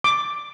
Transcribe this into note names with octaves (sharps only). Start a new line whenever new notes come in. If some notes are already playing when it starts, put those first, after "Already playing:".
D6